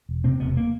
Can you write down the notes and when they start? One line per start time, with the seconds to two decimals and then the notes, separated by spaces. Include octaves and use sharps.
0.09 E1
0.24 C3 C4
0.40 E1 B3
0.57 A#3